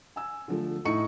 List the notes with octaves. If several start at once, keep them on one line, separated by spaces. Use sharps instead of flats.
G#5 E6
D3 F3 A3
A2 D#4 E4 C#6 C#7